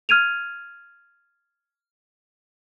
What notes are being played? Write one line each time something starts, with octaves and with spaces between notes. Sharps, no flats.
F6 G#6 D#7 F7